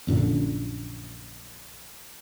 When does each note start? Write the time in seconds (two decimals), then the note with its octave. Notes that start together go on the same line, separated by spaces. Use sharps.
0.07 A#1 F#2 A#2 D3